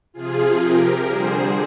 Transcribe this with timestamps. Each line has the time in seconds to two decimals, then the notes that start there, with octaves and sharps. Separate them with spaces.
0.14 C3 F3 F4 G#4
0.60 G4 A#4
1.05 D3 G3 G#4 C5